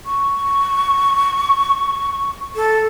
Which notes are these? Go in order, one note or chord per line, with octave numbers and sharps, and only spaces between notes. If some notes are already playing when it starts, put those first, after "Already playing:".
C#6
A4